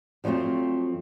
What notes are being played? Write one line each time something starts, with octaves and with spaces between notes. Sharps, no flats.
F2 F3 F#3 A3 C4